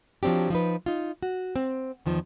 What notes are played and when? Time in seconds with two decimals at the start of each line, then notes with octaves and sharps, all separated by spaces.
0.23 F3 F#3 C4 D4 G4
0.50 F3 D#4 B4
0.86 D#4 F4
1.23 F#4
1.56 C4
2.06 E2 D#3 F3